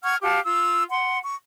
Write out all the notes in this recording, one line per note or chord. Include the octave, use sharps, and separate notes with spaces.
F#5 C#6 F6 G#6
F#4 G4 F5 A5
F4 E6
F#5 C6
C#6